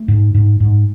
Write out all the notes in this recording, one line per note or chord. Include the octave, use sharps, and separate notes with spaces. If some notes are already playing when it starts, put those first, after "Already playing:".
Already playing: A3
G#2
G#2
G#2